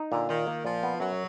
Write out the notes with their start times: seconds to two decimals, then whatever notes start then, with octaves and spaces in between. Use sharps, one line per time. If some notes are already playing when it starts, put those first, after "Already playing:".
Already playing: D#4
0.11 A#2 D3
0.29 D#3 F4
0.47 A#3
0.65 A#2 F3
0.83 B3
1.00 F#2 F#3